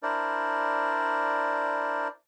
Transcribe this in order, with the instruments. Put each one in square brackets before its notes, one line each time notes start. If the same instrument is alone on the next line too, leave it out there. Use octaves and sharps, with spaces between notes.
[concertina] D4 E4 A#4 C5 D5